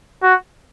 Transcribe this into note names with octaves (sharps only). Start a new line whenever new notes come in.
F#4